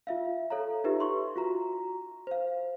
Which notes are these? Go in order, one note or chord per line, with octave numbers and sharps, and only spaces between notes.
F4 E5 F5
A4 C#5 F5 A#5
D#4 F4 G4 B4 E5
C6 C#6
F4 F#4 A#5
C5 F5